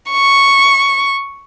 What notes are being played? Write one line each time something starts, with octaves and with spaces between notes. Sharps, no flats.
C#6